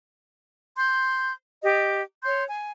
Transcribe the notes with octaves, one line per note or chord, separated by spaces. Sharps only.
C6 G6
G4 D#5
C#5 C6 G6
G#5